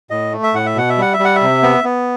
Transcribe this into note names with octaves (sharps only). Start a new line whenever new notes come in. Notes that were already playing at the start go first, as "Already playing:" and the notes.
A2 D#5
A3
E5
A2 F#5
E5
B2 F#5
E5
G3 F#5
E5
G3
F#5
E5
C3
B3
B3